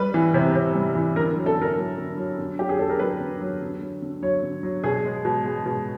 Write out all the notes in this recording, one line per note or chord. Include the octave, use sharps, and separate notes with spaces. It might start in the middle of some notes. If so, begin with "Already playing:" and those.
Already playing: G3 B4
E3
C3
C3
G3
E3
D3 A#4
F#3
A4
D3 A#4
F#3
D3
F#3
D3
F#3 G4
G#4
D3 A4
A#4
F#3 B4
D3
F#3
D3
F#3
D3
F#3 C#5
D3
F#3
B2 G#4
G#3
B2
G#3
B2